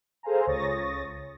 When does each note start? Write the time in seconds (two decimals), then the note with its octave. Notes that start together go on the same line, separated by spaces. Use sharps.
0.23 G#4 A4 C5 F5 G#5 A#5
0.47 C#2 C#5 C#6 D#6 A6 A#6